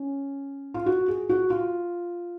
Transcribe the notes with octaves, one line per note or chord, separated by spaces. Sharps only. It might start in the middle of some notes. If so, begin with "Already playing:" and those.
Already playing: C#4
F4
F#4
G#4
F#4
F4